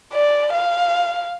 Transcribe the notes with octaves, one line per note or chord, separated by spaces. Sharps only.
D5
F5